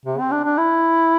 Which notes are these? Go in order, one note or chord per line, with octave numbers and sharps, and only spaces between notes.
C3
C4
D4
D4
E4